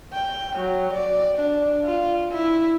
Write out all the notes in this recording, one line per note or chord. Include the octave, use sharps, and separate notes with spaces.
G5
F#3
D5
D4
F4
E4